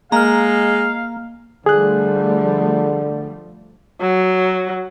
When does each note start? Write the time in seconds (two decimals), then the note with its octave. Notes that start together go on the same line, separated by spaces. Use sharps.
0.12 G#3 A#3 F5 A#5 F6
1.66 D3 F3 G3 A3 G#4 F#6
4.01 F#3